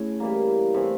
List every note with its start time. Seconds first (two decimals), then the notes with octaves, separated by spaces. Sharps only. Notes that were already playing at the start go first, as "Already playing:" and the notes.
Already playing: A3 C#4 E4 G#4
0.20 E3 G3 A#3
0.74 A2 E3 A3 C4